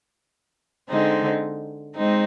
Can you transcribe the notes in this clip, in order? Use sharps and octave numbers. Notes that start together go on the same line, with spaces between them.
D3 G#3 C4 D#4
G#3 C4 D#4